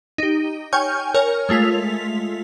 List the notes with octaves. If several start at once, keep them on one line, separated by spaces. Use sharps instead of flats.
D#4 G4
C#5 G5 G#5 C#6 F6 G6
A#4 C#5 G#5 F6
G#3 A3 F4 B6 F7